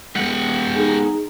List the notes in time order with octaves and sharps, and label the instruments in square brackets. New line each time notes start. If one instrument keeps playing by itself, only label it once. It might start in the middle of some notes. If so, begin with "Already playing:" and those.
[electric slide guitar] G#3 B3 [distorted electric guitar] G4 F#5
[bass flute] D#4 [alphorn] G#4